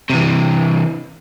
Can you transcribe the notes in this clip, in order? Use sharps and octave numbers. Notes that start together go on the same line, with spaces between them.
C3 E3